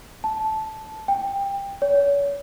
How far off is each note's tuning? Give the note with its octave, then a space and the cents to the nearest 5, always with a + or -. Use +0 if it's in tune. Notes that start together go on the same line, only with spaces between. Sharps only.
A5 -10
G5 +20
C#5 +35